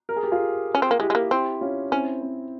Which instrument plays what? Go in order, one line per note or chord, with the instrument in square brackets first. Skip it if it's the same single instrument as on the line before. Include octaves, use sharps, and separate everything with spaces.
[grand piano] A#4
G#4
G4
F4 G#4
[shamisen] C#4
C4
A#3
[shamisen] G#3 [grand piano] E4 G4
[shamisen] G#3
A#3
[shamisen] C4 [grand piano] E4 G4
[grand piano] C#4 F4
[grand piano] C4 E4 [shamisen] C#4
[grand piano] C4